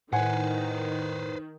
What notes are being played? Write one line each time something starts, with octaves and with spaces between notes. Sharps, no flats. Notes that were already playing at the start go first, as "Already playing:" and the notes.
A2 D#3 B4 C5 F#5 G#5